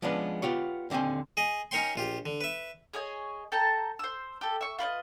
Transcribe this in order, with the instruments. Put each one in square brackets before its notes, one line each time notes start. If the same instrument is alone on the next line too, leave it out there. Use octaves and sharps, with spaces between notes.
[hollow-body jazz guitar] F3 G#3 B3 C#4 D4 B4
B3 F4 G4 C#5
D#2 D3 F3 C4 G#5
[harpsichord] G#4 D#5
C#4 D#4 A#4 C#5 G5 C6
A#1 F4 G4
D3
B4 E5
[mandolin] G#4 C#5 D#5 G#5
A4 G5 A5 A#5
C5 E6
G4 A4
E5 C#6
F4 B4 D5 D#5